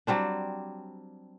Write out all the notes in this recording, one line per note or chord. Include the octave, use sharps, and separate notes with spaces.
F#3 G3 C4 D4